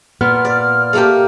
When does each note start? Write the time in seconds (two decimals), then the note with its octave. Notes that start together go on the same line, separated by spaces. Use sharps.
0.21 A#2 B3 F6
0.45 D5
0.93 A3 A#3 G4